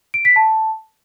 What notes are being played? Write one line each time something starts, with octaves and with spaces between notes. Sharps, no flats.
D7
B6
A5